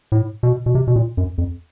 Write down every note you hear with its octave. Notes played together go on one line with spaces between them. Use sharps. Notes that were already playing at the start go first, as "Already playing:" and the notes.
A2
B2
B2
C3
B2
A#2
F#2
F2